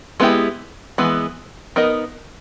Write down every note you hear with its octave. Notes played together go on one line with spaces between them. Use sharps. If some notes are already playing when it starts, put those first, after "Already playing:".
G#3 B3 E4 G4
E3 G#3 B3
B3 D#4 A#4 D#5